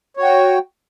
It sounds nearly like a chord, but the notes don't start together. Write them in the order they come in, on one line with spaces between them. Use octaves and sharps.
C#5 F#4 G5